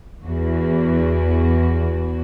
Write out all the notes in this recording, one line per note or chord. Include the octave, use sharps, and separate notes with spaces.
E2 F#4